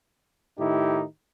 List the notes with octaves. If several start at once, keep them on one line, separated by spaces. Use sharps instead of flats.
A2 D#3 D#4 E4 G4